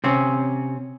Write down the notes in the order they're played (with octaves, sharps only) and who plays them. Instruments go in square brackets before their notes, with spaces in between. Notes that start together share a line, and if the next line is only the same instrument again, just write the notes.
[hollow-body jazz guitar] C3 C4 C#4